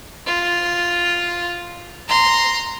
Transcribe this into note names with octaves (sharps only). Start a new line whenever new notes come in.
F4
A#5 C6